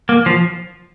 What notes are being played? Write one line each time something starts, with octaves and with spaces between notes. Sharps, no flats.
A#3
F3